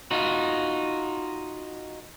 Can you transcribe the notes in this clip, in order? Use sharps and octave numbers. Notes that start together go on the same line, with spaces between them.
D#4 F4 F#4